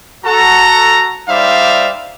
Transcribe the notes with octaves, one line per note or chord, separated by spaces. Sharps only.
F#4 A4 A#5
G3 D#4 C5 D5 E5 F5